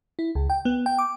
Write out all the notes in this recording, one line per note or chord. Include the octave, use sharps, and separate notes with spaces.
E4
C#2
G5
B3
G5
D6